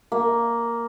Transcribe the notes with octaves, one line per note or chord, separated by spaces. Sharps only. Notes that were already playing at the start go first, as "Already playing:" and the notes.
A#3